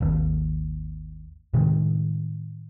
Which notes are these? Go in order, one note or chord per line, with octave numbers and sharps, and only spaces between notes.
G#1 D#2
A2 C3 D#3 G#3